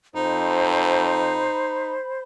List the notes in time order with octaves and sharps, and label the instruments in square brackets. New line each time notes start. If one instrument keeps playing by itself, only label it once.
[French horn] F2 [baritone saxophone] D#4 [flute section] C5 B5